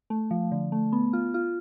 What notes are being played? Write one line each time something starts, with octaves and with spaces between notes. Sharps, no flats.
A3
F3
D3
A3
B3
F4
F4